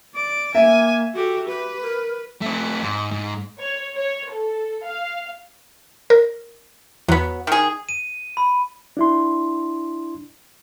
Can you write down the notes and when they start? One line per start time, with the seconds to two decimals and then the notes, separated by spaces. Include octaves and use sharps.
0.14 D5 D7
0.55 A#3 E5 G#5
1.15 F#4 G4 A4
1.48 G4 B4
1.81 A#4
2.41 A3 C4
2.82 G#2
3.11 G#2
3.59 C#5
3.96 C#5
4.31 A4
4.85 F5
6.10 A#4
7.08 E2 F#3 B3
7.47 D#3 G#4
7.89 D#7
8.37 B5
8.97 D4 E4 C6